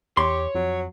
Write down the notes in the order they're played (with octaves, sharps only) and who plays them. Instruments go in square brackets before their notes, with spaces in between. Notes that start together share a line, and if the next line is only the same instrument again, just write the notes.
[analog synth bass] E2 [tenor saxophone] G4 [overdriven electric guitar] C#5 [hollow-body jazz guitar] C6
[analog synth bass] F2 [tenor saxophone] F#3